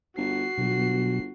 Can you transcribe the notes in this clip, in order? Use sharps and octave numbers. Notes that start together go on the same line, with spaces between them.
G1 F#4 C7
G1 B2 F#3